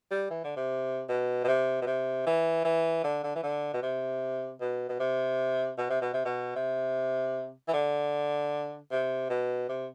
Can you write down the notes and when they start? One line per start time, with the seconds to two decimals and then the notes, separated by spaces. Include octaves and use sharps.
0.11 G3
0.30 E3
0.44 D3
0.56 C3
1.08 B2
1.44 B2
1.48 C3
1.81 B2
1.86 C3
2.26 E3
2.65 E3
3.04 D3
3.24 D3
3.35 E3
3.43 D3
3.74 B2
3.82 C3
4.61 B2
4.89 B2
4.99 C3
5.78 B2
5.90 C3
6.01 B2
6.13 C3
6.25 B2
6.56 C3
7.68 E3
7.73 D3
8.91 C3
9.29 B2
9.69 C3